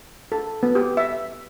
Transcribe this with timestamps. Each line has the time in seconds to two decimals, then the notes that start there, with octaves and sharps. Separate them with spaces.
0.32 A4
0.63 B3
0.75 G4
0.97 E5